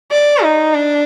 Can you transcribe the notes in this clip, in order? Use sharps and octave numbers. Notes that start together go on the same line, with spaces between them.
D5
D#4
D4